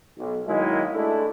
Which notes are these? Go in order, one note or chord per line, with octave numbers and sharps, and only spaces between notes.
B1
D#3 F#3 G#3 A#3 E4
G#3 A3 D4 E4